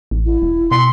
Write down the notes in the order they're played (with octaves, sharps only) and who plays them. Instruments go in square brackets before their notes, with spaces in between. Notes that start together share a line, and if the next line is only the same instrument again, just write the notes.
[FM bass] A1
[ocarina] E4
[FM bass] E1
[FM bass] B2 [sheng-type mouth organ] C6